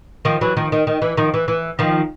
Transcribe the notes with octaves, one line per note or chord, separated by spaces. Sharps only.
D#3 F3
E3 F#3
D#3 F3
D#3
D#3
E3
D#3 F3
E3
E3
D#3 F3